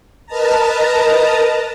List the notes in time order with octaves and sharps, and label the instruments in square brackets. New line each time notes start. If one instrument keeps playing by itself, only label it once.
[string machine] A#4 B4 D#5 A5 A#5